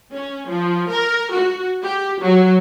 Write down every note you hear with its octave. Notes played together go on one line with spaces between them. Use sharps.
C#4
F3
A#4
F#4
G4
F#3